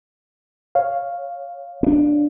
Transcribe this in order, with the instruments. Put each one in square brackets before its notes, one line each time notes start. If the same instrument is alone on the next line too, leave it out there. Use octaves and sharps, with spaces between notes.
[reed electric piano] C#5 F5
[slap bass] C4 D4